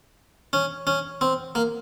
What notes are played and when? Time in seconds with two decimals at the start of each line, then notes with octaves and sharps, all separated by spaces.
0.53 C#4
0.87 C#4
1.21 C4
1.55 A#3